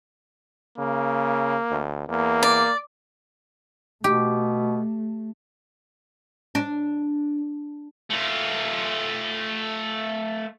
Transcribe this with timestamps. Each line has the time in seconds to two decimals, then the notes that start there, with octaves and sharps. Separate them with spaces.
0.78 C#3 A#3
1.71 D2
2.09 E2 A#3
2.43 D5
4.04 B2 A3 G4
6.55 D4
8.10 A3 F4